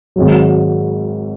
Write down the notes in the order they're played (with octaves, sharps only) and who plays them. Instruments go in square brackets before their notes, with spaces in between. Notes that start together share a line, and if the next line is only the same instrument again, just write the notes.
[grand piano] G#1 G#2 F#3